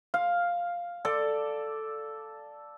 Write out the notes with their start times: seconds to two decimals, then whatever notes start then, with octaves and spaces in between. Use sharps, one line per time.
0.14 F5
1.05 A4 D5